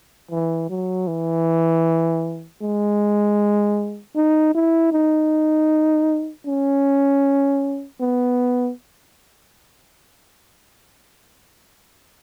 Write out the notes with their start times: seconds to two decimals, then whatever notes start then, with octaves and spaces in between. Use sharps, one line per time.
0.31 E3
0.69 F#3
1.07 E3
2.62 G#3
4.16 D#4
4.54 E4
4.92 D#4
6.47 C#4
8.01 B3